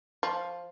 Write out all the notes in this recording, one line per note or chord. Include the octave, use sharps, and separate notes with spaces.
F3